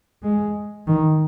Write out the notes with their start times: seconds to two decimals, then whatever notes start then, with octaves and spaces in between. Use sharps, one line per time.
0.23 G#3
0.87 D#3